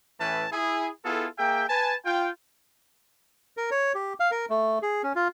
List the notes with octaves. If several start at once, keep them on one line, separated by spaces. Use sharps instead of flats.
A2 E3 C#4 E4 B4 A5
E4 G#4
B3 E4 F4 G#4 A4
A#3 G#4 E5 G5
B4 G#5 A5
F4 G5
A#4
C#5
G4
F5
A#4
A3
G#4
C#4
F4